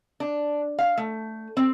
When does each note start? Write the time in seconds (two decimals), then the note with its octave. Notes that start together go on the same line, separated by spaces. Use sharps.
0.20 D4
0.79 F5
0.98 A3
1.57 C4